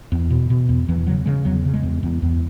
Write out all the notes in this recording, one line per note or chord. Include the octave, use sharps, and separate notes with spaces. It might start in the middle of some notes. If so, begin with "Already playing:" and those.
E2
B2
B2
E2
E2 E3
C#3 F#3
C#3 G#3
E2 F#3
C#3
G#3
E2
E2
E2